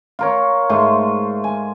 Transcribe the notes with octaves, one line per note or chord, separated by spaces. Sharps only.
F4 A#4 C#5
G#2 A3 C6
G#5